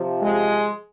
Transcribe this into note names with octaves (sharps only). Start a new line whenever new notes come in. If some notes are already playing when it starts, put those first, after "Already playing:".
Already playing: C3 F3
G#3